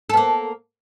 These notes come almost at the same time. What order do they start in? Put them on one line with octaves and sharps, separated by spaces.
A4 B3 A#3